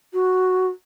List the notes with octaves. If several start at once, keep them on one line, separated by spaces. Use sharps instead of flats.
F#4